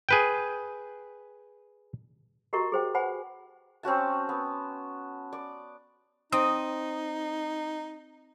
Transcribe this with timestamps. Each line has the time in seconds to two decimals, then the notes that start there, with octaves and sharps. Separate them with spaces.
0.09 G#4 B4 G5
2.53 F#4 G4 A#4 D#5 A#5 C#6
2.72 G#4 C5 G5
2.94 B4 C5 F#5 G#5 B5
3.83 C4 C#4 F#4 A5
4.29 B3
5.33 D5
6.32 C4 D#4 D#6